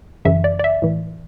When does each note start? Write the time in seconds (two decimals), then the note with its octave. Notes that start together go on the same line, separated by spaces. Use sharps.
0.25 F#2 C#3 E3 E5
0.44 D5
0.59 D5
0.64 E5
0.82 A2 E3